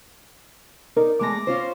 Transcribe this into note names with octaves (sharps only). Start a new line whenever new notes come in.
D#4 A#4 D5
E2 G#3 A3 D6 A#6
C#4 F4 C5